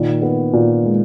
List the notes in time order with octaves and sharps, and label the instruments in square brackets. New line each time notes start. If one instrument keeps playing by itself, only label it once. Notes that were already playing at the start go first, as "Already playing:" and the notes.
Already playing: [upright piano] A#2 D#3
B3
A#2
G#3